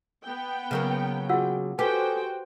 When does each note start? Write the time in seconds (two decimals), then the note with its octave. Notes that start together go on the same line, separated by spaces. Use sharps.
0.24 B3 G5
0.71 C#3 F#3 A#3
1.29 F4 F#4 G#4 F#5 E6
1.79 F#4 G4 A4 B4 C5 G5 G#5